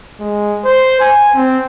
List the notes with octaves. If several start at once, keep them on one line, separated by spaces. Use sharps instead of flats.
G#3
C5
G#5
C4